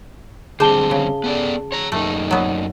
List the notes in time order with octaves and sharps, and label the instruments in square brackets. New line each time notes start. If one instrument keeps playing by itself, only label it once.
[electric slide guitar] D3 G3 C4 [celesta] G#4 A5 G7 [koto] C5
[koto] C#3
[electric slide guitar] B3 A4 D5
C#5 A#5
[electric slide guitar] F#2 A#3 D#4 [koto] A3
[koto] F#3 B3